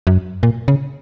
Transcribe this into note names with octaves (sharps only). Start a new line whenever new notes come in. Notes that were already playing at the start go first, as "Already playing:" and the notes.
F#2
A#2
C#3